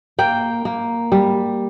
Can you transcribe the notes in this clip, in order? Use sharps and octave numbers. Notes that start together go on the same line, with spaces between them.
A#3 G5
A#3
G3